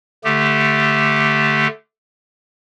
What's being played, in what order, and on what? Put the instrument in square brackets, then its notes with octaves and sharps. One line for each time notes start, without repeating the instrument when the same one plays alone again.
[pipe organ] D3 A3 G4